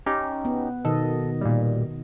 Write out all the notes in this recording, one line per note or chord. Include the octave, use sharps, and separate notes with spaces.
C#4 D#4 G4
B3
B2 D#3 A4 D#5
A#2 G3